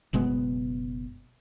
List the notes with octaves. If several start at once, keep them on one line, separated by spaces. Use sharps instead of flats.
F#1 B2 G#3 B3